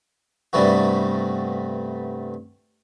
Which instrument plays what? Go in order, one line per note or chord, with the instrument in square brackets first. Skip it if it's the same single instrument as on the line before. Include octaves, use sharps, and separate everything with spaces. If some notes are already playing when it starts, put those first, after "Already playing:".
[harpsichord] G2 C3 G3 A3 B3 F#4